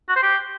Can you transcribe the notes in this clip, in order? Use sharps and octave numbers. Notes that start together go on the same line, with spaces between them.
F#4
C5
G4